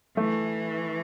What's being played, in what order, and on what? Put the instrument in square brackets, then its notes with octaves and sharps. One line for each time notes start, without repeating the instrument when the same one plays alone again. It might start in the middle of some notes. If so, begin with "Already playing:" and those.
[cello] E3 [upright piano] A3